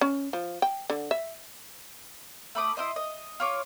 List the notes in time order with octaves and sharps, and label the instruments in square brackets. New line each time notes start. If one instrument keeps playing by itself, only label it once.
[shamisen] C#4
F3
G5
D3
E5
[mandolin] A3 B5 D6 D#6
E4 F4 C5 D#5
D#5
F4 C#5 D6